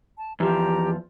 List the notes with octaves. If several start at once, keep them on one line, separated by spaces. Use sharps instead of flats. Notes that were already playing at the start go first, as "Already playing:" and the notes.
A5
E2 F3 G4 A#5